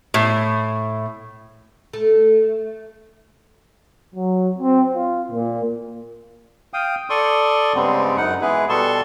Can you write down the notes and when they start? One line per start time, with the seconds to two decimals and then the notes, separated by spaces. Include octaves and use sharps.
0.14 A2
1.93 A3
4.14 F#3
4.59 C4
4.95 F4
5.32 A#2
6.74 F5 G5 D#6
7.10 A4 D5 C6 C#6 D#6
7.75 G2 C#3 G3 G#3 B3 C4
8.17 F#2 D#4 F#5
8.41 E3 G#3 B3 E4 G#4 B4
8.69 B2 G3 A4 A5 C6 C#6